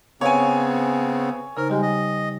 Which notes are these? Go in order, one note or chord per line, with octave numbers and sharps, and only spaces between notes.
C#3 B3 C4 C#5 F5 G#5
C#3 D#4 A#4 C5
G3 G#3 G4 G#5
D#5